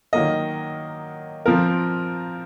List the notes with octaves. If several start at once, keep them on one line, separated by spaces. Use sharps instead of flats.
D#3 F#3 A#3 D#5
F3 C4 F4 A#4